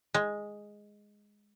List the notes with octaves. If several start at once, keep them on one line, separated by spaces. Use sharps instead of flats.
G#3